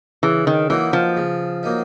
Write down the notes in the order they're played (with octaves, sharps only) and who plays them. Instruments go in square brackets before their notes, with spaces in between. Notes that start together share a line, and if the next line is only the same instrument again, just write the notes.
[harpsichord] C#3 [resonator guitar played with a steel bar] E3
[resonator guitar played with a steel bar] D#3
[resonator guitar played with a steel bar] E3 [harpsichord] F#3 A#3 D#4
[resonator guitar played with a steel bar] F3
[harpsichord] C#3
F#3 A#3 D#4